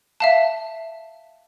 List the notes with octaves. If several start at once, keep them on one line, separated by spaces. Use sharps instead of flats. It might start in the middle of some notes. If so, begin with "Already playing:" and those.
E5 F5 A5